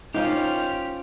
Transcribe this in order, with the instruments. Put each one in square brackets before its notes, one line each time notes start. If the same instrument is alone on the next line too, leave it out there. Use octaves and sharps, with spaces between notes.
[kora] C#4 F4 C5 [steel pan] D#4 [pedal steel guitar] G4 [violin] F7